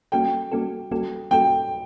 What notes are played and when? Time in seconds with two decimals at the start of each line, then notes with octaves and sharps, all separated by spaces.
0.12 G3 A#3 C#4 F#4 A4 G5
0.52 G3 A#3 C#4 F#4 A4
0.91 G3 A#3 C#4 F#4 A4
1.31 G3 A#3 C#4 F#4 A4 G5